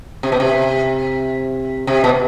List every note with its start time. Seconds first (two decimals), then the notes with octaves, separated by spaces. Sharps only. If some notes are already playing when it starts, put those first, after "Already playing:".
0.23 C3
0.32 B2
0.40 C3
1.87 C3
2.04 B2